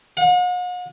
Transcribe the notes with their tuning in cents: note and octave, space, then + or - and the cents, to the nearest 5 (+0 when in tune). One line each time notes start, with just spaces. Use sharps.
F#5 -45